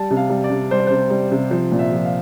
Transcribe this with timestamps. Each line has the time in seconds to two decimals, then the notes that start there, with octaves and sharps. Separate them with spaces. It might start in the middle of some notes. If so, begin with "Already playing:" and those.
Already playing: G3 A5
0.11 C3
0.17 F5
0.30 G3
0.44 D5
0.50 C3
0.71 G3 C5
0.79 D5
0.87 C3 C5
1.10 G3
1.32 C3
1.51 F3 C5
1.72 A#2
1.79 E5
1.92 F3
2.05 F5